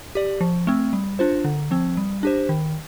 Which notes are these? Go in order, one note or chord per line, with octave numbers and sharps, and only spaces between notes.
G4 D5
F3
A3 C4
G3
D4 F4 C5
D3
F3 C4
G3
D4 G4 C5
D#3